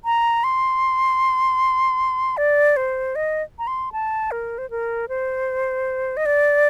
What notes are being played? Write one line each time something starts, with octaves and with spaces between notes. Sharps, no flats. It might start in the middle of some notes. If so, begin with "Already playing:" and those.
A#5
C6
D5
C5
D#5
A#5
C6
A5
A#4
C5
A#4
C5
D#5
D5